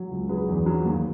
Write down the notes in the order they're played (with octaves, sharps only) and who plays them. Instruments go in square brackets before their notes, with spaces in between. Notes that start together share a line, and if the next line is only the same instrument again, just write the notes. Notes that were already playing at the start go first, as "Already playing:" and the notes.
Already playing: [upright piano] F#3
C#2
F#3 G#4 B4
E2
F#3
D#2